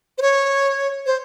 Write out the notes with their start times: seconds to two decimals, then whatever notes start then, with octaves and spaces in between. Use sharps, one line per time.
0.18 C5
0.22 C#5
1.06 C5